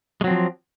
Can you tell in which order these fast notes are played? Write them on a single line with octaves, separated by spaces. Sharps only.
G#3 F#3 C4 F3